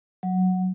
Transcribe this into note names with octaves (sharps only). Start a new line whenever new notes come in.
F#3